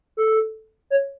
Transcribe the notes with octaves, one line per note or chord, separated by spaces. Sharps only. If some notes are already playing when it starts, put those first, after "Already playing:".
A4
C#5